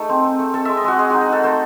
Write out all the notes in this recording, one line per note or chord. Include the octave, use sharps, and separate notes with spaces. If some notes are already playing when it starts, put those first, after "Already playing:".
Already playing: A3 D#4 G#4
C4
C4
A3
C4 A4
G#3 E5
D#5
G#3 F#4
G#3 G#4
D#4 F#4
G#4
D#4 A4
A3 C5